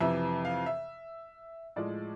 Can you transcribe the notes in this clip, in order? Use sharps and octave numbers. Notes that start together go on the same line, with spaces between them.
F2 C3 E3 E5
F5
E5
A2 F3 G#3 D5